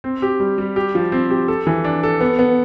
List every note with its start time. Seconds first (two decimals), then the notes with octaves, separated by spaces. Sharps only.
0.04 C4
0.22 G4
0.40 G3
0.58 G3
0.76 G4
0.95 F3
1.12 C4
1.30 G4
1.48 A4
1.67 E3
1.85 D4
2.03 A4
2.21 B3
2.39 B3